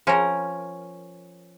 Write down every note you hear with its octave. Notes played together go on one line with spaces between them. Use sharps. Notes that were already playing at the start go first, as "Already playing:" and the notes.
F3 C#4 A#4